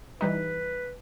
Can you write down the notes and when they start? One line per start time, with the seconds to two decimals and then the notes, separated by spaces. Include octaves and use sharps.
0.21 E3 G3 D#4 B4